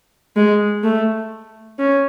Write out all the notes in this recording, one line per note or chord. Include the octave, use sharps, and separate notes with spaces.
G#3
A3
C#4